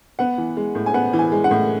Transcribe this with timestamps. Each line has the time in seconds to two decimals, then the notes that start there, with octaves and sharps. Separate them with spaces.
0.19 B3 F#5
0.38 E3
0.57 G#3
0.75 A2
0.86 G#5
0.94 B3 F#5
1.13 E3
1.19 G#5
1.32 G#3
1.44 F#5
1.51 A2